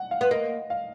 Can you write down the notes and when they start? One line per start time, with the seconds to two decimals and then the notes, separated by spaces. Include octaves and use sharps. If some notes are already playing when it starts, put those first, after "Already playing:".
Already playing: F#5
0.11 F5
0.21 B3
0.31 A#3 D#5
0.70 F5